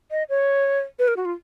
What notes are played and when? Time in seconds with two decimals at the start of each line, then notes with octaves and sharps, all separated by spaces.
0.11 D#5
0.29 C#5
0.99 B4
1.08 A#4
1.17 F#4
1.25 F4